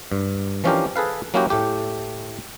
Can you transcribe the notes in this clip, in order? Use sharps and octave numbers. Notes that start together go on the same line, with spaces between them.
G2
E3 F3 C#4 D4 G4 A#4
G#4 A4 B4 F5
F#3 A#3 C#4 E4 F#4 G4
A2 A3 G4